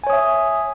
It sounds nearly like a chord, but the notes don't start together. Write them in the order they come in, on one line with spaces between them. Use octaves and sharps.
G#5 C#5 D#6 E5